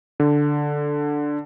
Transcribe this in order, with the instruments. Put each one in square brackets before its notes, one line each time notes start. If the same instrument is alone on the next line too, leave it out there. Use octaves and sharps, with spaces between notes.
[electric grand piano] D3